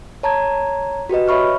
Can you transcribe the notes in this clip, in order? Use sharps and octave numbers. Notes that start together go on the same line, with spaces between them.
C#5 A5 A#5 G#6
F#4 G4 B4 D#5
C#5 E5 B5 C#6 F6